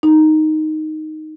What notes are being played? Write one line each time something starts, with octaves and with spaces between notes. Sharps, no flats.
D#4